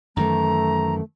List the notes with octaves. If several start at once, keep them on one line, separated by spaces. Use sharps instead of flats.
F#2 D#3 E3 A3 A#5